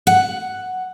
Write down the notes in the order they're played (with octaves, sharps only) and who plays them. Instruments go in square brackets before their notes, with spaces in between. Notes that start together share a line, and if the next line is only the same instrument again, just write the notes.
[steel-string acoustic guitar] F#5